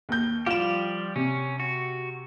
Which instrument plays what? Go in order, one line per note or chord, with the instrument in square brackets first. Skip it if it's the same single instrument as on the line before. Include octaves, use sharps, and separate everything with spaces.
[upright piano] D#2 G6
[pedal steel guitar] F3 G3 G4 [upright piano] F4 E7
[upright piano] C3 [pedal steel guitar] C#4
[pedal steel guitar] F#4